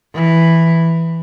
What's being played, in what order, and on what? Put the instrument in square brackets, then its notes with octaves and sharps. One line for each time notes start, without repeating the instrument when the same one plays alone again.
[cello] E3